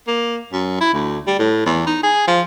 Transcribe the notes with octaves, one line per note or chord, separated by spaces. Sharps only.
A#3
F#2
E4
D2
G3
A2
E2
D#4
G#4
F3